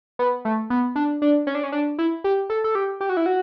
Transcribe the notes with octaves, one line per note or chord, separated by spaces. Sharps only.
B3
A3
B3
D4
D4
C#4
D4
C#4
D4
E4
G4
A4
A4
G4
G4
F#4
E4
F#4